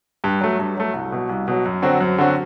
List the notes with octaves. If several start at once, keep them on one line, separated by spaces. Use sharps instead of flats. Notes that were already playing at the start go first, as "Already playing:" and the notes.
G2
F#3 A3
G2
F#3 A3
C2
B2 F#3
C2
B2 F#3
F#2
D3 F#3 C4 F#4
F#2
D3 F#3 C4 F#4